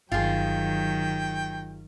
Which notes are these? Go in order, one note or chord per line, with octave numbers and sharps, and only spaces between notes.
G1 D#3 F#3 F4 G#4 G5